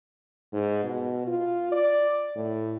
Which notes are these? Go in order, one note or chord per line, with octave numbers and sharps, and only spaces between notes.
G#2
B2
F4
D5
A2